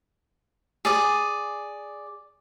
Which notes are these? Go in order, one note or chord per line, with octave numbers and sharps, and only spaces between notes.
G#4 D5 D#6